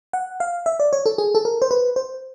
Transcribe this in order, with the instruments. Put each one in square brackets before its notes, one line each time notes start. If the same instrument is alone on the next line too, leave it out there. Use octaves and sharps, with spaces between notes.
[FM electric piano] F#5
F5
E5
D5
C#5
A4
G#4
A4
A#4
C5
B4
C5